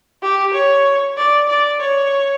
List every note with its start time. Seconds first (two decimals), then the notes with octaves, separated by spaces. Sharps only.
0.22 G4
0.54 C#5
1.17 D5
1.48 D5
1.80 C#5